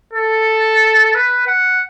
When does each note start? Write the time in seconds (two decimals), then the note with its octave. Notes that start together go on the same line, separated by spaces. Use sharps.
0.13 A4
1.14 B4
1.47 F#5